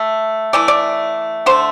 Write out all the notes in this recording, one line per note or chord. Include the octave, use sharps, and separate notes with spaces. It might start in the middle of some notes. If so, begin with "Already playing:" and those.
Already playing: A3
E3 A3 D5
D5
D3 A3 C5